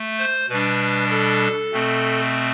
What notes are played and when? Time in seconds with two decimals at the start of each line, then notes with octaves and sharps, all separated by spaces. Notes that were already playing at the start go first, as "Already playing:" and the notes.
Already playing: A3
0.18 C5
0.49 B2 G3 D4 B4
1.10 A4
1.72 B2 A3 C4